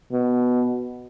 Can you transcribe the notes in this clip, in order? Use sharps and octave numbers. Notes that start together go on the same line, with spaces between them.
B2